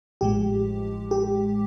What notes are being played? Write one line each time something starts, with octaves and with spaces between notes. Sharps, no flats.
A1 A2 F3 G#3 G4
G4